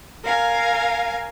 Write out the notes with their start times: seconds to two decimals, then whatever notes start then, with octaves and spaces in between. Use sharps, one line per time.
0.23 A#4 F5 G#5